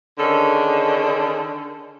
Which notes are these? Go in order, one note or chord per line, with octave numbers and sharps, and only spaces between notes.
D3 D#3 C#4 G#4 A4